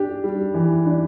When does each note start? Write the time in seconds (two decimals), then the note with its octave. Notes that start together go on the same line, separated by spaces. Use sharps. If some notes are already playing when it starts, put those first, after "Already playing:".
Already playing: D4 G4
0.24 G3
0.54 E3
0.86 D4